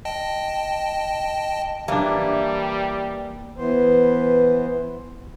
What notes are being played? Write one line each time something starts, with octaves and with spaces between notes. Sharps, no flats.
D#5 G5 A5
E3 G3 A#3 D4
E3 B3 C5